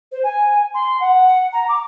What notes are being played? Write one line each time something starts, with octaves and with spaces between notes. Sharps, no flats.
C5
G#5
C6
F#5
A#5
D6